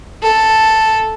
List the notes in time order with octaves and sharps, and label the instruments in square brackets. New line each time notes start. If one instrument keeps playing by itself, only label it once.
[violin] A4